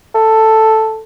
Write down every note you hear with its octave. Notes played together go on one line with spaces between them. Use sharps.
A4